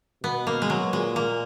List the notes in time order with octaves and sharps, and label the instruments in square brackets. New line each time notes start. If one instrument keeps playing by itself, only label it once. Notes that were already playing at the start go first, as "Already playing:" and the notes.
[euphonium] B2 [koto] B3
[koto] A#3
G#3
F#3
[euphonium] A#2 [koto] G#3
[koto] A#3